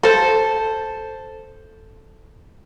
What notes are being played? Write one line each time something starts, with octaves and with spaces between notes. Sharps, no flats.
A4 C5